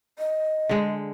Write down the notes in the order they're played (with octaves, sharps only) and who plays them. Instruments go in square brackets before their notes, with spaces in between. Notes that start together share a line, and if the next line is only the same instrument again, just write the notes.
[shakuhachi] D#5
[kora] D3 G#3